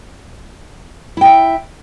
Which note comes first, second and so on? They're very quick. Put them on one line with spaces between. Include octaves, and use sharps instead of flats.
E4 G5 E5